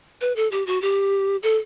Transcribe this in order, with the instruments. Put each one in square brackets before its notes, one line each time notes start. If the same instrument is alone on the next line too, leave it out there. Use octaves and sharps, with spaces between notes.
[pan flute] B4
A4
G4
F#4
G4
A4